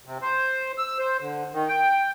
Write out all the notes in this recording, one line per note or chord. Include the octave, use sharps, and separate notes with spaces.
C3
C5
E6
C5
D3
D#3
G5